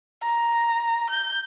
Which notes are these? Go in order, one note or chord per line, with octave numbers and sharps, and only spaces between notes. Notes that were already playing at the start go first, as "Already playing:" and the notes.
A#5
G6